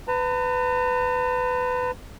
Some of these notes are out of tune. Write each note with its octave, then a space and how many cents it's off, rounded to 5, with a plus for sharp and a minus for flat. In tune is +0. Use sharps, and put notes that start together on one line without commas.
B4 +20 A#5 -45